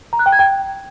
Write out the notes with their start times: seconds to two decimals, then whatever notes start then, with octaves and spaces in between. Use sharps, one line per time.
0.13 A#5
0.19 F#6
0.26 G5
0.32 G#6
0.39 G5